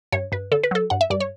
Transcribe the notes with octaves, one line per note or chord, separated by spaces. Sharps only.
G2 C#5
G2 B4
D3 A4
B4
F#3 A4
G2 F#5
E5
G2 D5
C#5